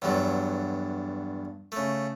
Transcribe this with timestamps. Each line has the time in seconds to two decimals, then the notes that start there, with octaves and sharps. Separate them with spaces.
0.02 E2 G2 D3 F#3
1.72 C#3 A3